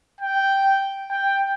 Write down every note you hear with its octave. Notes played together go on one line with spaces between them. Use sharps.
G5
G5